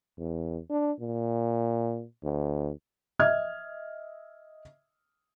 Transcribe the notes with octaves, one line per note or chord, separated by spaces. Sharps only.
E2
D4
A#2
D2
D#5 E5 F6 G#6